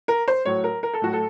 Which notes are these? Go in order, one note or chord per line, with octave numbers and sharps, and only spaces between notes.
A#4
C5
A2 F#3 C#5
A#4
A#4
A4
A2 F#3 F#4
A4